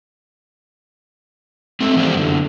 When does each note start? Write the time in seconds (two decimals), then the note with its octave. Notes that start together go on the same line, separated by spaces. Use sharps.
1.80 G#3 A3 C4
1.96 E3 G3 A#3 G4 C5 D5
2.14 F#2 D3